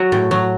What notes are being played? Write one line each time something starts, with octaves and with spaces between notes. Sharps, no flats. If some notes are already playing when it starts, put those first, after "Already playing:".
Already playing: F#3 F#4
A2
F#3